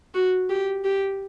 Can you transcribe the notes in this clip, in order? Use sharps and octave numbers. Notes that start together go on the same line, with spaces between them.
F#4
G4
G4